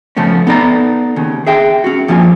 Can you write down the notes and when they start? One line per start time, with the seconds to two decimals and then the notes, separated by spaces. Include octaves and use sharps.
0.17 C#3 F3 A3 B3 C#4
0.47 B3 D#4 A4 D5 A#5
1.16 D#2 C#3
1.47 G#4 E5 G5
1.84 C#4 F#4
2.08 G2 F3 A#3 F4 G#5